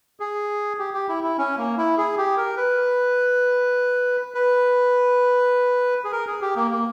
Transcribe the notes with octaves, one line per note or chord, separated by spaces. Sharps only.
G#4
G4
G4
E4
E4
C#4
A#3
E4
G#4
G4
A#4
B4
B4
G#4
A#4
G#4
G4
A#3
A#3